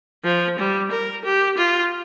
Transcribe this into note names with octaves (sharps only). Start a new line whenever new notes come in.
F3
G3
A#4
G4
F4